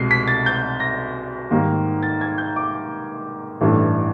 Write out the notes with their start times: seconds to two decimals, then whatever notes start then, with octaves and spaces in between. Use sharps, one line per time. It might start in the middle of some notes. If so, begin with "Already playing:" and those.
Already playing: C2 B2 G#3 C7
0.11 B6
0.28 A6
0.46 G6
0.80 A#6
1.51 G#2 D#3 G3 A#3
2.03 A6
2.21 G#6
2.38 G6
2.56 D6
3.61 A1 G2 E3 A3 D4